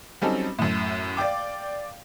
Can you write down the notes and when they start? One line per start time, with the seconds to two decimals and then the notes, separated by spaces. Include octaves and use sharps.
0.22 F#3 G3 C4 C#4 D#4 A4
0.59 F#2 A2
1.17 D5 F5 G5 D6